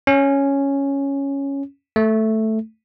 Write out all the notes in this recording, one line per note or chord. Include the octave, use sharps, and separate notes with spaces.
C#4
A3